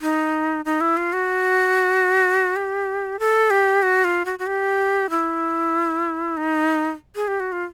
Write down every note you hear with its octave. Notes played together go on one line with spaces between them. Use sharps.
D#4
D#4
E4
F4
F#4
G4
A4
G4
F#4
F4
F#4
F#4
G4
E4
D#4
G#4
G4
F#4
F4